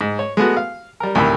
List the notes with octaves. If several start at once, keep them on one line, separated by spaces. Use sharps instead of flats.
G#2
C#5
G#3 A3 B3 F#4
F5
G3 A#4
D2 A2 C3 D#3 B5